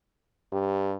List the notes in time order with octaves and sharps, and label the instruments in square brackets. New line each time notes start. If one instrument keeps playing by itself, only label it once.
[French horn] G2 [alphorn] G4